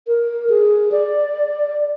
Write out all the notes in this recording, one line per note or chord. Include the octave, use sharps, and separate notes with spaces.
A#4
G#4
D5